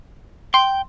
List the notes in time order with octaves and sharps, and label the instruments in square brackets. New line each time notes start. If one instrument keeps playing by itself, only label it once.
[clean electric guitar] G5 [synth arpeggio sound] C6